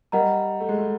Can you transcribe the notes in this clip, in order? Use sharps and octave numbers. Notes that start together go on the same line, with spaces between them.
G3 A#4 D#5 F#5 A#5
A3
G#3
A3